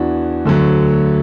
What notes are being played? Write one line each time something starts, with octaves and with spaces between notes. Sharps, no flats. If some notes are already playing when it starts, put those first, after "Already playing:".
Already playing: E2 E3 D4 F#4
D2 D3 F#3